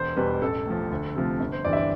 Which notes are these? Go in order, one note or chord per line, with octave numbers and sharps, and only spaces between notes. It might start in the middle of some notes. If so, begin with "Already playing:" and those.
Already playing: E1 C5
E2 B2 G3 B4
A1 A4
A2 F3
D2
C3 F3 A3
G1
C5
G2 E3 D5
E5
D5